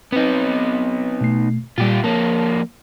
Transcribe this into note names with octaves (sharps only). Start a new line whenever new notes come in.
B3 C4 D#4 B4
B2 A3 C7
A#2 G3 F4 G4
F2 A#3 C#5 A5